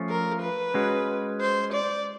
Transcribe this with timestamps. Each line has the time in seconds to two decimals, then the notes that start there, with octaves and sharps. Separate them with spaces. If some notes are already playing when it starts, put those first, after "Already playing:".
Already playing: F3 A3 C#4 F4
0.09 A#4
0.42 B4
0.74 G#3 C#4 F#4
1.41 C5
1.73 D5